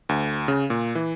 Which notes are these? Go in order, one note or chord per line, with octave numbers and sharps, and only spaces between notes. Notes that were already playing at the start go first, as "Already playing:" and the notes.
D2
C#3
A#2
E3